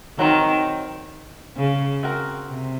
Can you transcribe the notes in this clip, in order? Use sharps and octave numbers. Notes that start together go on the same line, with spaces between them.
D#3 F#3 C4 D#4
C#3
C4 F#4 A#4
C3